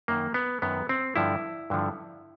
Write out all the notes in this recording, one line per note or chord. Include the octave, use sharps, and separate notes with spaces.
F#2 D#3 A#3
B3
F#2 D#3 B3
C4
G2 D3 F3 E4
G2 D3 F3